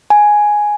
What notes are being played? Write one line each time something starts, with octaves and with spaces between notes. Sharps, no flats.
G#5